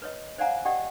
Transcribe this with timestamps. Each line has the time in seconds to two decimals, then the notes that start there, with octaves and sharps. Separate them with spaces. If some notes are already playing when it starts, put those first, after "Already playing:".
0.02 B4 C#5 D#5
0.38 C5 D5 F5 F#5 G#5 A#5
0.65 G4 D5 D#5 F#5 G5